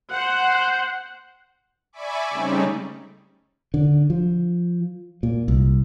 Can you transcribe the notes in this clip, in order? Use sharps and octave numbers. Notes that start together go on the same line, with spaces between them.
C5 F#5
D5 E5 G#5 B5 C#6 D6
C#3 G3 A3 C4 C#4 D#4
D3
F3
A#2
C2